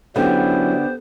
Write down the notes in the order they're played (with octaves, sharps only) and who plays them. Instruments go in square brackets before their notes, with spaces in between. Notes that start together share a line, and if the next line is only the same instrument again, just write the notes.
[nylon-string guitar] D3 [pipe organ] F#3 C#4 E4 [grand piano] B3 G4 [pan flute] C5